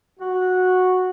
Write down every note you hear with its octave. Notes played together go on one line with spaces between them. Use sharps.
F#4